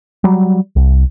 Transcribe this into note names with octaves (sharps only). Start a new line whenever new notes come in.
F#3 G3
C2